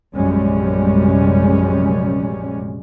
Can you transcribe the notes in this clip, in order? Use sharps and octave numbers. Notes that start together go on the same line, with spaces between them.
A#1 F#2 C3 G3 G#3 C#4